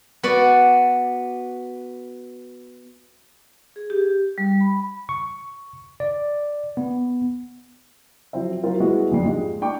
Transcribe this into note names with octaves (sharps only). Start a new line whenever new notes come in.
B3 F#4 D5
G#4
G4
G3
B5
C#6
D5
B3
F3 F#3 C4 E5
F#3 C4 F4 A#4
G3 G#3 B3 E4 F#4
F#1 F2 G#2 D4 C7
G#3 F4 G4 D#5
D4 G5 C#6 D6